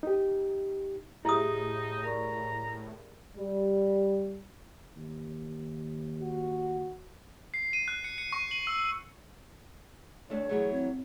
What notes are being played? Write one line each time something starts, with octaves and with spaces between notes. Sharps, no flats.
D#4 G4
A2 D#4 E4 G4 G#4 E5 D#6
A#4 D5 A#5 C#6
G3
D#2
F#4
C7
D#7
F#6
C#7
C#7
C#6
F#7
E6
D2 A3 D4 C#5
E3 F#3 A3 G#4
C4